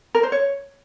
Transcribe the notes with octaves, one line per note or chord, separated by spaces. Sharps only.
A#4
C5
C#5